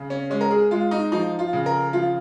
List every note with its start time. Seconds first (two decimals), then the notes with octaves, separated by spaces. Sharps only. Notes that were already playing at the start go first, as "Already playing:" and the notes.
Already playing: C#3
0.10 C#4
0.30 G#3 C#4
0.41 A#4
0.51 G#4
0.71 G#3 F4
0.91 D#4
1.12 F3 D#4
1.39 F4
1.53 C#3
1.66 A#4
1.93 F3 F4